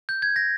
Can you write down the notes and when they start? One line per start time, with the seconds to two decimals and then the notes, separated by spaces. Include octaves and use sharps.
0.09 G6
0.22 G#6
0.36 A#6